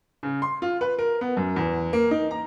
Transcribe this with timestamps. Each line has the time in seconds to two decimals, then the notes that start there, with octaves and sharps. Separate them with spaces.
0.23 C#3
0.42 C6
0.62 F4
0.81 B4
0.99 A#4
1.21 B3
1.37 F#2
1.56 E2
1.93 A#3
2.11 D#4
2.31 A#5